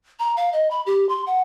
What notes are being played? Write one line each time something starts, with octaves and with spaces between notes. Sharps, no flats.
A#5
F5
D#5
B5
G4
C6
F#5